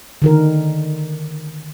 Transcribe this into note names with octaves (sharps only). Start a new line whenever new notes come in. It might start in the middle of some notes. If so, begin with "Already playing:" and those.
D3 D#3 A#4